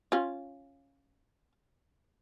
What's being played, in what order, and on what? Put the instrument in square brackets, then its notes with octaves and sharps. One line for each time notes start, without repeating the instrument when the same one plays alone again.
[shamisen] C#4 F4